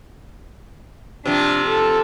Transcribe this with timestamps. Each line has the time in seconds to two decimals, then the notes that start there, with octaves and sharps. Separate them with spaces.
1.25 C3 F3 D4
1.67 A4